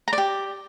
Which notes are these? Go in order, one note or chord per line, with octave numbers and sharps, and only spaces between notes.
A#5
D5
G4